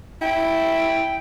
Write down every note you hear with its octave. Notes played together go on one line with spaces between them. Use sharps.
E4 G5